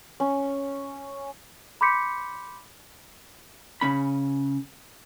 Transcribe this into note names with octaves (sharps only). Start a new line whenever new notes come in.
C#4
B5 C6 D6 G6 B6 C#7
C#3 C#4 B5